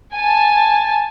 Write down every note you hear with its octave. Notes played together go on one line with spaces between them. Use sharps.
G#5 A5